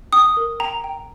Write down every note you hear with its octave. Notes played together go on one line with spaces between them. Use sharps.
G5 D#6
A#4
G5 A#5
G5